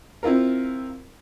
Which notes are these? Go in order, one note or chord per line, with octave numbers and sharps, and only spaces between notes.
C4 E4 F4 A#4